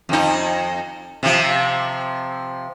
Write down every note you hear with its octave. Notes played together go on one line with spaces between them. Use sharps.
F2 D#4
C3 F3